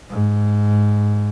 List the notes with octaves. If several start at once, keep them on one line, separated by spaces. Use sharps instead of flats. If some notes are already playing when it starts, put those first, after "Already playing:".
G#2